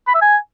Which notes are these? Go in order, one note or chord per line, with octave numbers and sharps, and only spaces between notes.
B5
E5
G#5